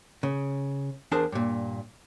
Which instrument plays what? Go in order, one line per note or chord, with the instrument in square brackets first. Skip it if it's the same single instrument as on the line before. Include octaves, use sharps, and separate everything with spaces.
[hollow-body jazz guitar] C#3
E2 D4 G#4 A#4 C5 A5
G2 A#2